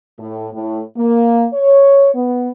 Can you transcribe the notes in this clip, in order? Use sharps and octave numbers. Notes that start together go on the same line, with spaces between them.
A2
A2
A#3
C#5
B3